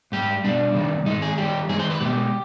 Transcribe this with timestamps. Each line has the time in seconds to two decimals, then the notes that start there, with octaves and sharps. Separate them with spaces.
0.12 G#2 G3 G4
0.44 B2 G3 D4
0.75 C3 D#3 G3
1.06 G#2 D#3 G#3 D#4
1.22 G#4
1.38 G2 D#3 G3 G4
1.69 G2 D#3 G#3 G#4
1.79 C5
1.90 B4
2.01 B2 G#3 G4